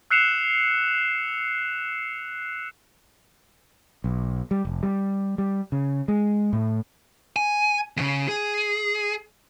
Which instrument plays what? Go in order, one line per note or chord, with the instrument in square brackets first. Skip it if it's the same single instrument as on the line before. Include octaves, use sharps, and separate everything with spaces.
[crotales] E6 F#6 C7 C#7 E7 F7
[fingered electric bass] B1
G3
F1
G3
G3
C#3
G#3
A2
[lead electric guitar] G#5
E2 C#3
G#4